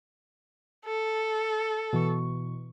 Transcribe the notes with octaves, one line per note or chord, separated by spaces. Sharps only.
A4
B2 E3 C#6